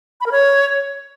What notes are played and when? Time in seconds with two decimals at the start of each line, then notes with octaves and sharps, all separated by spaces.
0.21 B5
0.26 A#4
0.32 C#5